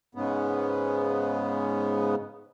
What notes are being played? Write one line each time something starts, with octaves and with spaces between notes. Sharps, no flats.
G#2 C#3 B3